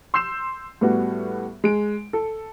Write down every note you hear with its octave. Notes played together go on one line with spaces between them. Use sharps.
C6 E6 G6 C7 E7
A2 G3 B3 F#4
G#3 D7
A4